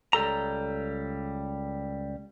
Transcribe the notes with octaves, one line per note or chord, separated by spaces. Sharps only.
C#2 G3 A4 A#5